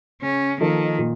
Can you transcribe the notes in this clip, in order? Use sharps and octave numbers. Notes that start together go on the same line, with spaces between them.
C#3 C#4
D#3 F3 A#3 D#4 A4
A#2